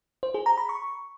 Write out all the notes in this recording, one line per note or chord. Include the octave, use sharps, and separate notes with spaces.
C5
G#4
A#5
B5
C#6